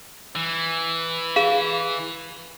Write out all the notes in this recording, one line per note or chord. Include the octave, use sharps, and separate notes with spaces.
E3
G#4 F5